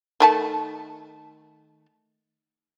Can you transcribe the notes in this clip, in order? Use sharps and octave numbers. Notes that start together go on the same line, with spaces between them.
D#3 A3 A5